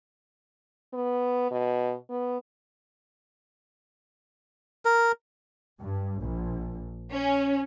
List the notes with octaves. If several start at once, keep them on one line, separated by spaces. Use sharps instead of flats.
B3
B2
B3
A#4
G2
A#1
C#4